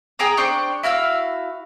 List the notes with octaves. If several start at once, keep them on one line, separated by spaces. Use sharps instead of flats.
G#4 G5 A#5 D#6
D4 C5 G5 C#6
E4 F#4 F5 E6